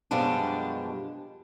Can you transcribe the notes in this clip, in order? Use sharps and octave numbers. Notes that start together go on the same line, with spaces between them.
F#2 B2 F3 G3 G#3 D4